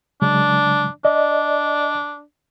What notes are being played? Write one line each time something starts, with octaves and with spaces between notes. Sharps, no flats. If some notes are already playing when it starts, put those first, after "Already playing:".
C#3 F#3 G#3 D4
D4 D5 D#5